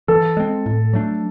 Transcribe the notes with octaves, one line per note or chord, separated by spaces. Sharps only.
E3 A4
G#3 C4
A2
F#3 A3 D4